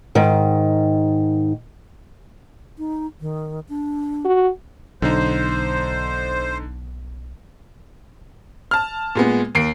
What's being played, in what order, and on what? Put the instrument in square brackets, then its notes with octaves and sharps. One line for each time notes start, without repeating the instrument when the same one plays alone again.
[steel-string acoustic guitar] G#2 D#3
[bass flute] D#4
D#3
D4
[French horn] F#4
[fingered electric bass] B1 [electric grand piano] D3 D#4 [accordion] C5
[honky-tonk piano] A5 F6
A#2 G#3 B3
D#2 C7 D7